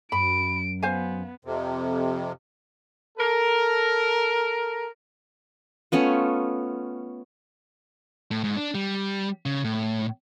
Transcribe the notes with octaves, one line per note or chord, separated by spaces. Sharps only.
F#2 B5 D7
B3 C5 F5 G#5
F2 C3
A4 A#4
A3 B3 C#4 F4
A2
G#2
D4
G3
C#3
A2